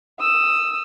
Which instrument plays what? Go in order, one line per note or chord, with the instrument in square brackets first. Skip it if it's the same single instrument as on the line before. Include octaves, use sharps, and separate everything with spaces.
[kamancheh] D#6 E6